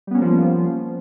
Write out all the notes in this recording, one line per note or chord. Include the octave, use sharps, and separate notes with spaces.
F3 G3 A#3 B3 C#4